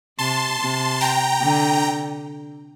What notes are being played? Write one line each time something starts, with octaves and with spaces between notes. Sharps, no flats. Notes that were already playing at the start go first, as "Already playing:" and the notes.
C3 A5 C6
C3
G5 A#5
D3